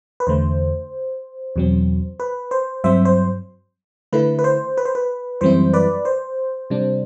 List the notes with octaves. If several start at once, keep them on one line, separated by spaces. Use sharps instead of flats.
B4
E2 D3 A3 C5
E2 B2 F#3 C4
B4
C5
G2 F#3 C4 C5 E5
C5
D3 A3 E4 B4
B4
C5
B4
C5
B4
F#2 E3 G3 C4 E4 C5
B4 D5
C5
C3 G3 D4